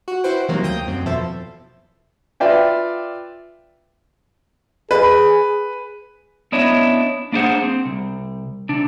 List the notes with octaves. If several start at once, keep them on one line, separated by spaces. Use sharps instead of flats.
F#4
E4 F#4 B4 C5 G5
C3 D#3 E3 F#3 A#3 C4
D2 A#3 G5 D#6 G6
G1 F#2 C4
E2 B2 F3 A4 C5 E5
F4 B4 D5 E5 G5
G#4 B4
B3 C#4 D4 E4 C#5 D#5
A#3 D4 E4 G#4 C5 F#5
C4
C2
C3 D4